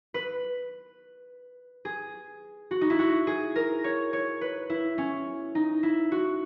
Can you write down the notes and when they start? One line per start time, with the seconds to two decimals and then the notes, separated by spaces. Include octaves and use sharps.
0.14 B4
1.85 G#4
2.71 F#4
2.81 D#4
2.90 E4
2.99 F#4
3.27 G#4
3.56 A#4
3.84 C#5
4.13 C#5
4.41 B4
4.70 E4
4.98 C#4
5.55 D#4
5.83 E4
6.12 F#4